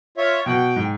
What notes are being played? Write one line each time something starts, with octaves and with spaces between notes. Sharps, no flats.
F4 C#5 E5
B2 F#5 G5
G#2